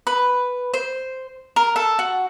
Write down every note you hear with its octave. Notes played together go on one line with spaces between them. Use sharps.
B4
C5
A#4
A4
F#4